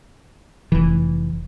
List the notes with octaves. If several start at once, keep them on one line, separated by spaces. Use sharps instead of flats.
F1 E3